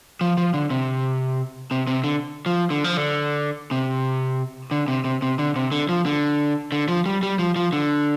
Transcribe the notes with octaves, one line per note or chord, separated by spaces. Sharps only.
F3
F3
D3
C3
C3
C3
D3
F3
D3
F3
D3
C3
D3
C3
C3
C3
D3
C3
D3
F3
D3
D3
F3
G3
G3
F3
F3
D3